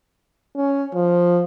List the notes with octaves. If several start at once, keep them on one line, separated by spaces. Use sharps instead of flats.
C#4
F3